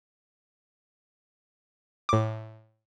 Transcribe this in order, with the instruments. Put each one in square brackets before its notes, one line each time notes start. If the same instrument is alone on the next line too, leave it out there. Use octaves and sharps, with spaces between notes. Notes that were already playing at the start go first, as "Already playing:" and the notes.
[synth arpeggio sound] A2 D6